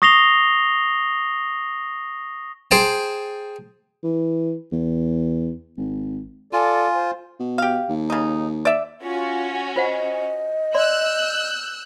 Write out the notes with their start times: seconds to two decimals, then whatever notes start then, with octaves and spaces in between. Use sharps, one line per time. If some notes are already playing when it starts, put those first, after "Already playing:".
0.02 C#6 D#6 A#6 C7 F7 G7
2.71 G#4 C5 G5 A5
4.03 E3
4.72 E2
5.77 G#1
6.53 F4 A4 D5 G#5
6.95 C5
7.39 B2
7.58 G4 F5
7.89 D#2
8.10 C#3 D#4
8.65 D5 E5
9.01 C#4 F4 F#4
9.76 F4 C5 D#5 F#5
10.74 D5 C6 E6 F#6 G6